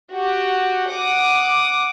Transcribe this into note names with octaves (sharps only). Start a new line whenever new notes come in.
F#4 G4
F#5 D6 D#6